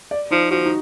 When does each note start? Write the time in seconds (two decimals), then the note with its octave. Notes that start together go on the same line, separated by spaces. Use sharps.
0.11 D5
0.31 F3 D#4
0.51 F3 F#4
0.65 D#4